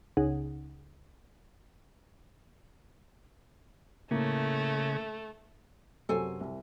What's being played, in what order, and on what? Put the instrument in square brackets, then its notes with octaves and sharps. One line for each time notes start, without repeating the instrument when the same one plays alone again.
[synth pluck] C#2 C#3 D#4 G#4 F#5
[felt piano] A2 A#3 [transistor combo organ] C#3 [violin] A3
[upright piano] F#2 C3 F#3 [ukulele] A4 C5 G#5
[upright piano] C2